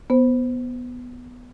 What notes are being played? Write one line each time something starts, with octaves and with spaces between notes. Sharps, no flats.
B3 C5